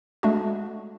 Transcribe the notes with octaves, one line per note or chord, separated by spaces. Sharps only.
G#3 A3 D4 F#4